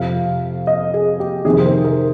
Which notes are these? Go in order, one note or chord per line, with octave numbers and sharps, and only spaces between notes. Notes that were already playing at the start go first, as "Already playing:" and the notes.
Already playing: F2 C3 F3 F5
D#5
G#4
G4
F2 C3 D#3 G#4
C5
A#4
A#4